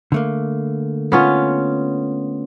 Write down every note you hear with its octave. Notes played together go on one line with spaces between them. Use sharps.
D3 A3 A#3
B3 C#4 F4